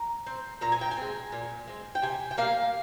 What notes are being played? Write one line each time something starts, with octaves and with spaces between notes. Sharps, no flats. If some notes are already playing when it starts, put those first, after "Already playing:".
Already playing: A#5
C4
A#2 A#5
G#5
G5
G#5
G#3 C4
A#2
G#3 C4
G5
C3 G#5
G5
G3 A#3 F5